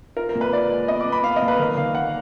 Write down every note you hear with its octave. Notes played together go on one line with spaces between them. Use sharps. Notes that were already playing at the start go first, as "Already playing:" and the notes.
F4 A#4
A#4
A#2
B4
F4 D5
G#3
B3 D#5
D6
B3
B5
B3 F5
D#5
A#2
B4
D#3 A#4
D#3 F5
A#3 F#5